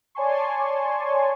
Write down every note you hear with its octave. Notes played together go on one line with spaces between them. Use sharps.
C#5 D5 G#5 A5 C6 C#6